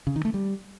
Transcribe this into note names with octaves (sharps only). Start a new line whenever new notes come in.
C#3
D#3
A3
G3